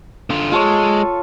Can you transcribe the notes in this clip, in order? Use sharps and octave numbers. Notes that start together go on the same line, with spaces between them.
D3 F4
G#3 F4 A4 C#5